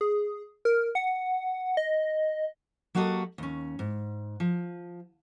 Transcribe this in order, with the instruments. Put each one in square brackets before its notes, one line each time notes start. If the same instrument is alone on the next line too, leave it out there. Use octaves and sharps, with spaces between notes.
[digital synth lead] G#4
A#4
F#5
D#5
[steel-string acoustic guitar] F#3 A#3 F#4 G4 A4 D#5
D#2 C#4
G#2
F3